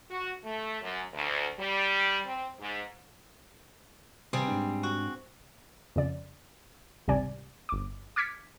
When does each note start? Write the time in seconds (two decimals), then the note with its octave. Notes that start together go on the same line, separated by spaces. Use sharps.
0.11 F#4
0.45 A3
0.81 F#2
1.14 D2
1.59 G3
2.25 C4
2.60 G#2
4.33 C3 G3 C4 G#4
4.48 G#2 D4
4.83 F#4
5.96 F2 C#3 D5
7.08 G#1 C#2 C3 G3 D5 G#5
7.69 G1 D6
8.16 D6 F6 G#6 B6 C#7